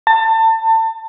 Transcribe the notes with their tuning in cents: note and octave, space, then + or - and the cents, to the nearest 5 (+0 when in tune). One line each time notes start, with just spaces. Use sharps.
A5 +30